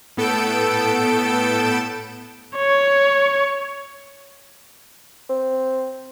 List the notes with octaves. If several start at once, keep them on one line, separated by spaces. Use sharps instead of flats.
A2 B3 A4 E6 G6 D7
C#5
C4